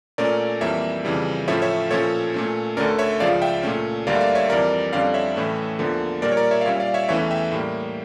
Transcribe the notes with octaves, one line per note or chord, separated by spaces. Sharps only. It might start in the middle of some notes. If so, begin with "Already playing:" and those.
A#2 A3 C#4 A#4 D5
F2 E3 G3 A#3 C#5 E5
F2 C#3 E3 G3
A2 F3 A3 C#4 C#5 E5
C#5 E5
A#2 F3 C#4 A4 C#5
A#2 A3 C#4
D2 D3 A3 C#4 A#4 D5
C#5 E5
C#2 C#3 F3 D5 F5
E5 G5
A#2 A3 C#4
D2 D3 G3 A#3 D5 F5
E5
D5 F5
C#5 E5
F2 E3 G3 A#4 D5
F2 D3 G3 C#4 D5 F5
C#5 E5
A2 E3 A3 C#4
E2 D3 F3 A#3
A#2 G3 A#3 A#4 D5
C#5
A#4 D5
C#5 E5
F5
A#2 G3 C#4 C#5 E5
D5 F5
C#5 E5
E2 E3 A3 C#4 C#5 E5
E5 G5
A2 G3 A#3